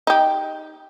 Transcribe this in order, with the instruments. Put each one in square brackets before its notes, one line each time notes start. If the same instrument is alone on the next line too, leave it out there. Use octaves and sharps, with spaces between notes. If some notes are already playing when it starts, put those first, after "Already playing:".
[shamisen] D#4 G4